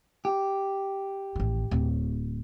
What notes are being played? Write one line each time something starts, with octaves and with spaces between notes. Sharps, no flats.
G4
A1 D#3
D1